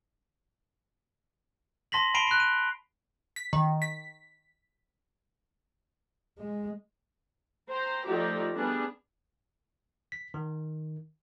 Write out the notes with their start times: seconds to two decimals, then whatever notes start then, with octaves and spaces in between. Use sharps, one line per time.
1.92 A5 C6 A#6 B6 F#7
2.14 A5 B5 C7 D7 F7 G7
2.27 F#6 C7
2.40 D#7
3.36 B6
3.53 D#3
3.82 B6
6.38 G#3
7.70 C5 G5 A#5
8.06 F3 A3 D#4 G4 D5 A#5
8.56 G3 B3 D4 G#4
10.12 B6
10.34 D#3